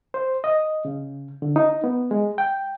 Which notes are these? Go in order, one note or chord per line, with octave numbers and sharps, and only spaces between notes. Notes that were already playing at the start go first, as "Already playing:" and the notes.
C5
D#5
C#3
D3
D#4
B3
G#3
G5